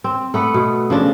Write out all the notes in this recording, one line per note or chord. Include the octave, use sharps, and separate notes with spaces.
C4
A3 B3 B4
B2
C#3 F3 D4